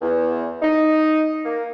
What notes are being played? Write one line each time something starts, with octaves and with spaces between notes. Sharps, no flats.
E2
D#4
A#3